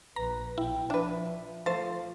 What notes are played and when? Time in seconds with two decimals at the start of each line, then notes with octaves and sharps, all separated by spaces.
0.16 A#1 B4 A#5
0.58 B1 E4 G5
0.90 F3 D4 B4 E5
1.66 F3 A3 C5 F5 A6